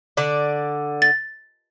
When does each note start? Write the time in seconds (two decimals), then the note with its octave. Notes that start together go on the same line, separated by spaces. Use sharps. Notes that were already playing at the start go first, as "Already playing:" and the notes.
0.17 D3 D5
1.02 A6